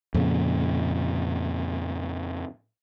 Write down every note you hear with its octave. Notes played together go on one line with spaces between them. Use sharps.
F2 A#2 C#3